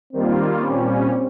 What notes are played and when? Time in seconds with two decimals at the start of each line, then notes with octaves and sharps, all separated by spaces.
0.13 D#3 G3 A#3 C4 F4
0.61 A#2 G3 C4 C#4